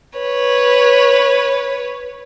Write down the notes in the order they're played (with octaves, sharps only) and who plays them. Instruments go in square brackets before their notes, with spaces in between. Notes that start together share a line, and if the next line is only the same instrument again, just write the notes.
[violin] B4 C#5